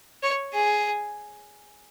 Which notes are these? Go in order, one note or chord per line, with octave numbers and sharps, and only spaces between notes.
C#5
G#4